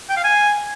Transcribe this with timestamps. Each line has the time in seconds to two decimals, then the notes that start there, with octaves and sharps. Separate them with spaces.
0.10 G5
0.17 F5
0.24 G#5